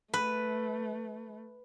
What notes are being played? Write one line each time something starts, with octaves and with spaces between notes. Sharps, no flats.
A3 B4